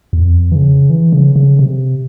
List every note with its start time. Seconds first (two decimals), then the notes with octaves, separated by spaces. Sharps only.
0.13 E2
0.21 F2
0.52 E3
0.55 C#3
0.90 E3
1.13 C#3
1.36 C#3
1.59 C3